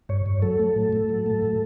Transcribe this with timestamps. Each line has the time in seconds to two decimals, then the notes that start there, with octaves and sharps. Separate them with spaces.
0.09 G2 C#5
0.26 G2
0.42 F#3 A4
0.60 A3
0.76 A2
0.93 A2
1.09 F#3
1.26 A3
1.42 A2